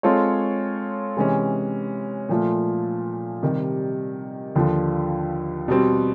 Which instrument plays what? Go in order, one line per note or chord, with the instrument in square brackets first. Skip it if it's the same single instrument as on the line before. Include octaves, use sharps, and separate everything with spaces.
[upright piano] G#3 C4 F4 A4 C#5
C3 E3 G#3 C#4
A#2 F3 A3
C3 D#3 G3
D#2 D3 F3
B2 G3 C4